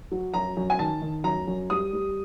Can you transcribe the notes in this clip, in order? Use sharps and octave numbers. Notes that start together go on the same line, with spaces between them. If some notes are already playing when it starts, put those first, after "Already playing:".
F#3
F#2 A#5
F#2
G#5
D#3 A5
D#3
F#2 A#5
F#2
G3 D#6
G3